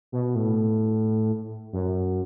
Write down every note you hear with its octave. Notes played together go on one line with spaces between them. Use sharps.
B2
A2
F#2